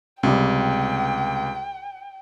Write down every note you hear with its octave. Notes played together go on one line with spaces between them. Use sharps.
C#2 C3 G3 G5